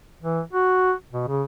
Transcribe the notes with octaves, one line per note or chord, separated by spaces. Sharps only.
E3
F#4
B2
C#3